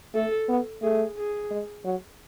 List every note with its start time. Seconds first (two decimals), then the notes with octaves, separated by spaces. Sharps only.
0.15 A3 A4
0.49 B3
0.82 A3 G#4
1.17 G#4
1.51 G#3
1.85 F#3